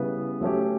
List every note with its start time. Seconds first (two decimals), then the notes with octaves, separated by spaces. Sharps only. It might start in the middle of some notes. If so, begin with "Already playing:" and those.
Already playing: C#3 G3 B3 E4 B4
0.41 F#3 A3 C#4 G4